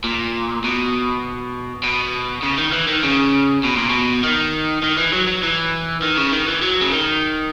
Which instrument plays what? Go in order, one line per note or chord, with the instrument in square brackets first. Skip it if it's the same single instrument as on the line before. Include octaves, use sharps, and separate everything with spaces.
[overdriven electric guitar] A#2
B2
B2
C#3
D#3
E3
D#3
C#3
B2
A#2
B2
D#3
D#3
E3
F#3
F#3
E3
D#3
C#3
D#3
E3
F#3
C#3
D#3